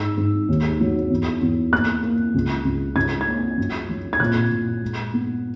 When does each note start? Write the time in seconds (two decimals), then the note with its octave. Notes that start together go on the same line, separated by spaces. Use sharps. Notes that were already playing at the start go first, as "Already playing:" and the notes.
Already playing: G#2 E6
0.17 G#2
0.48 D#2
0.80 F#3
1.10 E2
1.41 E2
1.72 A#3 F#6
2.03 A#3
2.34 C#2
2.65 C#2
2.96 C#2 G#6
3.21 G#6
3.27 A#3
3.58 F#2
3.89 F#3
4.13 G#6
4.20 A#2 F#6
4.51 A#2
4.82 G#3
5.13 B3